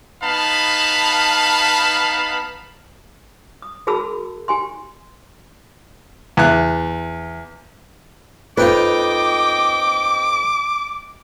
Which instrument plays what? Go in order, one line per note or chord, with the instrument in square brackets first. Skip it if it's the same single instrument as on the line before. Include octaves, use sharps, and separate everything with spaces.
[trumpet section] B3 D#4 F5 A5 B5
[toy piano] D#6
F#4 G#4 A#4 A5 B5 E6
G4 G#5 C6
[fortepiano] E2 F#6
[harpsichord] F2 D#4 [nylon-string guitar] F4 B4 [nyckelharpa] D#5 G5 [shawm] D6